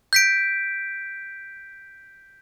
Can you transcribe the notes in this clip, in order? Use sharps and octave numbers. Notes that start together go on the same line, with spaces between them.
G6 B6 D7